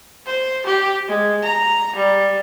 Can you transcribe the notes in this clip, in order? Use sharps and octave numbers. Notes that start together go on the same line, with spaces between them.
C5
G4
G#3
A#5
G3